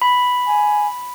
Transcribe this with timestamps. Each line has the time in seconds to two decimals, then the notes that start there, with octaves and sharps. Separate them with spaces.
0.02 B5
0.47 G#5